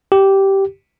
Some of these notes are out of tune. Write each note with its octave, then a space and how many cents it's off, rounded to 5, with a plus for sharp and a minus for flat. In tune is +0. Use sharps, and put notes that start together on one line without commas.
G4 -10